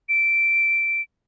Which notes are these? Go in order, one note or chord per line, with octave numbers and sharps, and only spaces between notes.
D7